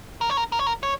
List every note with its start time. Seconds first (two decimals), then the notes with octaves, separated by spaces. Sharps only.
0.21 A#4
0.30 C#5
0.37 A#4
0.52 A#4
0.59 C#5
0.67 A#4
0.83 C#5